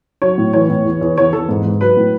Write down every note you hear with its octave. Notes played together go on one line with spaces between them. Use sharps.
F#3 C#5
A2
E3 C#5
A2
E2
E2
E2 C#5
E2 A4
G#2
G#2
F#3 B4
A2